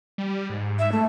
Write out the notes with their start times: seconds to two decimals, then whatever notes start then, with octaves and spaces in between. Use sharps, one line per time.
0.18 G3
0.50 G#2
0.79 E5
0.92 A3